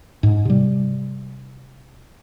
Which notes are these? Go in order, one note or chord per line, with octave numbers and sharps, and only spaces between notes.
G#2
C3 G3